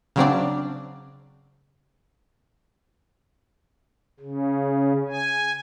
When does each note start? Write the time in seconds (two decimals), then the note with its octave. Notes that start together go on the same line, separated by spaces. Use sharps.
0.16 C#3 F#3 C4 D4
4.20 C#3
5.08 G#5